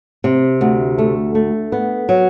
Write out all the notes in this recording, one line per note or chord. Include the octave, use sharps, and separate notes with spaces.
C3
D2
A3
A3
B3
F#3